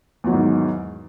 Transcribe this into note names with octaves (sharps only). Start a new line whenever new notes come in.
E2 G#2 D#3 F#3